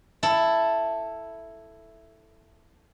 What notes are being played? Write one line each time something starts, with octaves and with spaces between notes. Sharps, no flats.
E4 A4